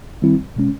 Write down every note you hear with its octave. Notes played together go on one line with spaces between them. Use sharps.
D#3 G3 C4 E4
B2 G#3 C#4